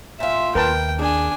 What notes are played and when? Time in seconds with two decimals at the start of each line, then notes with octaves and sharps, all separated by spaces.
0.20 A#2 F4 E5
0.55 D#2 A#4 B4 G5 A5
0.99 D4 G#4 G#5